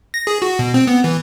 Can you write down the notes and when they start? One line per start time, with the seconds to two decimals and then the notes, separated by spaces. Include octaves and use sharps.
0.14 A#6
0.27 G#4
0.42 F#4
0.59 B2
0.74 C4
0.87 B3
1.04 E3